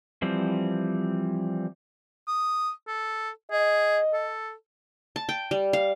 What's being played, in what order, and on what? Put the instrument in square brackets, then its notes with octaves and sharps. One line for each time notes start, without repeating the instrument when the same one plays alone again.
[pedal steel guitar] E3 F3 G3 C4
[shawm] D#6
A4
[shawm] G#4 [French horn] D#5
[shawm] A4
[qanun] A5
G5
G3
F5